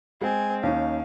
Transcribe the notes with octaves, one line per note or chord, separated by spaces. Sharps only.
G#3 C4 G#5
D#2 C#4 D#4 F5